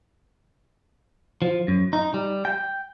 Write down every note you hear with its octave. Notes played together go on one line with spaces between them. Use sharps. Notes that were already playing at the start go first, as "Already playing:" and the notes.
F3
F#2
D#4
G3
G5